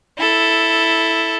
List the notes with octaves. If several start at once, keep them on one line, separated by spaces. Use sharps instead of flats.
E4 A4